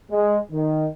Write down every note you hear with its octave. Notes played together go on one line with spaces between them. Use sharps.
G#3
D#3